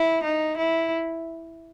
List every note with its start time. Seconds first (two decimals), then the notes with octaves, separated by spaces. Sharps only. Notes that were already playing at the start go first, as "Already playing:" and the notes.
Already playing: E4
0.24 D#4
0.57 E4